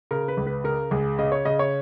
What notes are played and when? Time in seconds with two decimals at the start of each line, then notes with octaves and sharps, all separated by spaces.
0.11 C#3 A#4
0.28 B4
0.37 C#2
0.47 B4
0.64 C#3 A#4
0.91 C#2 G#4
1.19 C#3 D#5
1.32 C#5
1.45 C#3 D#5
1.59 C#5